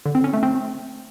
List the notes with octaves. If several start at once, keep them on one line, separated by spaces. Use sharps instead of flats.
D3
C4
C#4
A3
C4